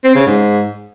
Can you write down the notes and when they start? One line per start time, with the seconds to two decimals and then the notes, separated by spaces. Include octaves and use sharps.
0.04 C4
0.15 C#3
0.26 G#2